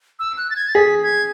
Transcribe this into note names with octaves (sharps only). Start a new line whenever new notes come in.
E6
F#6
A6
G#6
A6
G#4 B6
G#6